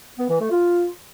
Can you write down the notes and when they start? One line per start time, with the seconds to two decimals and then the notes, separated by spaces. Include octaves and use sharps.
0.18 B3
0.29 E3
0.40 A3
0.51 F4